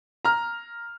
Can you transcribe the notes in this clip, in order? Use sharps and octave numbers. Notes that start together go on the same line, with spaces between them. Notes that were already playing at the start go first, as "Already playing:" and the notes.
A#5 F6